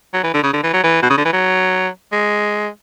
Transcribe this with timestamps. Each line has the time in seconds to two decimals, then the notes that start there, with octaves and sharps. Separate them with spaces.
0.14 F#3
0.23 E3
0.34 D3
0.43 C#3
0.53 D3
0.63 E3
0.73 F#3
0.83 E3
1.02 B2
1.10 C#3
1.18 D3
1.25 E3
1.33 F#3
2.12 G#3